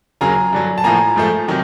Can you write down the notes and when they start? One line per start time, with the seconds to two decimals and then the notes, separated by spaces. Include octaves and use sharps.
0.21 D#2 C#3 F#3 A#3 G#5 A#5
0.53 G2 D3 F#3
0.78 A5
0.84 A2 F3 A#3 G#5 A#5
1.16 G#2 F3 A3
1.48 C3 D#3 F#3